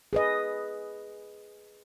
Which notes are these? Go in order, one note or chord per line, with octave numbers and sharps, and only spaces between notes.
G#4 B4 D#5